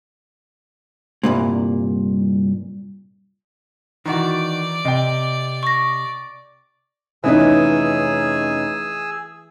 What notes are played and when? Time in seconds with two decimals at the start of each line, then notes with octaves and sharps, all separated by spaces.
1.23 C2 G2 A#2
4.06 D#3 E3 F#4 D5 D6
4.85 C3 D#5 G5
5.63 C#6 A#6
7.24 F1 E3 C#4 D#4 G#4 B4 G#5 E6